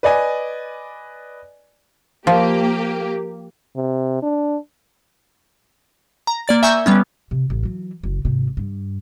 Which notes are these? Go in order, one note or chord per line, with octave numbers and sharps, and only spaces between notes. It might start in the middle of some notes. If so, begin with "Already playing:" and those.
B4 D5 D#5 G#5
F3 A#3 G4
C3
D4
A#5
A#3 D5 A6
E5 G#5 A#5 C#6 E6 G6
G3 B3 C#4
C3
A1
E3 F#3
F#1
G#1 C3
G2